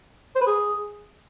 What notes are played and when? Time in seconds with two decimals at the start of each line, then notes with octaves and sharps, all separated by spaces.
0.35 C5
0.41 B4
0.47 G#4